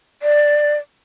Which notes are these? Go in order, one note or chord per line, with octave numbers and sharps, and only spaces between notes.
D5